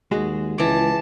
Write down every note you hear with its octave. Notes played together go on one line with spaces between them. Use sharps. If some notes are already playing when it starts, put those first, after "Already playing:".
D#2 G#3 F#4 G#4
C#2 E3 A5 D6